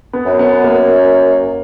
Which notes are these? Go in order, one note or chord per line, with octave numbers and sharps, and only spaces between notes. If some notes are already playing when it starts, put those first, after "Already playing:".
B3
F#2
B3
A#3